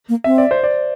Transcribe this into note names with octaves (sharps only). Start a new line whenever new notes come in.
A#3
C4 E5
D5
C5
D5